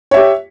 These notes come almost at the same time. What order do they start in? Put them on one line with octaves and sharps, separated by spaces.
C#5 E5 G4